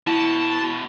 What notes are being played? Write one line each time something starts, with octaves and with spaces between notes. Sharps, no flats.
E2 B2 E4 A5